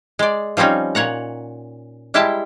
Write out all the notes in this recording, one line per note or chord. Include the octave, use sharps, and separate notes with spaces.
G#3 D5
F3 G3 C4 C#4 D#4
A#2 C#5 F#5 A#5
G3 G#3 E4 G4 G5 A5